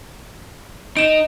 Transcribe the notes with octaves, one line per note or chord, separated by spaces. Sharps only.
D#4 D7 E7